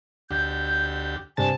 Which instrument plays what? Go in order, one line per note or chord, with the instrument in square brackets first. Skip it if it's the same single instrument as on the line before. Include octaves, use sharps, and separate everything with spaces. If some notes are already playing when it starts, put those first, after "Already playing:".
[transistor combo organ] D2 G4 [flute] G6
[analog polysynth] G2 C3 A5 [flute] G#5